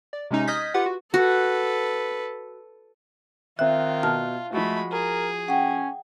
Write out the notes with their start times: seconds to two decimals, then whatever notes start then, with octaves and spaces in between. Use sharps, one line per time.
0.13 D5
0.31 C3 G#3 C#4 D#4
0.48 D#5 D#6 F6 G6 G#6 B6
0.74 F4 G4 B4 F#5
0.86 F#4
1.14 F#4 A4 B4
3.59 D#3 C4 F4 E5 F#6
4.03 B2 A5 F6
4.53 F3 G#3 A3 F#4 B5
4.92 G#4 A#4
5.48 C#4 F#5 G5